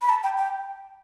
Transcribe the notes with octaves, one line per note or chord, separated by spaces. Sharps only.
B5
A5
G5
G5